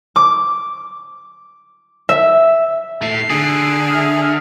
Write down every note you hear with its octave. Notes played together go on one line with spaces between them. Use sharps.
D6
E5
A3 E4 C7
D3 G#4
E5 F6